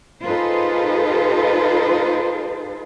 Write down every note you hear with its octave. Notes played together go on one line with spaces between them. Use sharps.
D#4 F4 G#4 A4 B4 C5